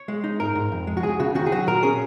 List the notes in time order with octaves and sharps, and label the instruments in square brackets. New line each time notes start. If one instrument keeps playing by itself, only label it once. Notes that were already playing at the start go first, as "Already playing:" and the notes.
Already playing: [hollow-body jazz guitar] C#5
G#3
D#4
G#2 A#4
G#2
F2
G#3
F#4
C#2 G#4
C#3 F#4
D#3 F#4
G#4
F#3 F#4
A#2 A#4
C#4 G#4